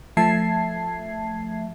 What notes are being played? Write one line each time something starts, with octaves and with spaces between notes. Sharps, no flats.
F3 A3 E5 A5 G#6 C7